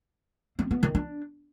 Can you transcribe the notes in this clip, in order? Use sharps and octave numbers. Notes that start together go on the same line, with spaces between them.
C4
B3
D#3
D4